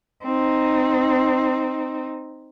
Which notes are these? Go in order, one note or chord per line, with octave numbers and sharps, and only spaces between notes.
C4 D#4